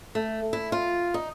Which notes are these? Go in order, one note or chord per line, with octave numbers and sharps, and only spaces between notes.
A3
E4
F4
D#4